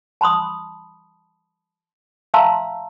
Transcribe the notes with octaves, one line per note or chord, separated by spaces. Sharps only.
A5 B5 C6 D#6
E5 F5 A5 A#5 C6 E6